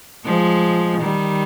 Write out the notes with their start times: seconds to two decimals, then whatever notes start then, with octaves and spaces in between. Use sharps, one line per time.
0.25 F3 G#3
1.01 D#3 G3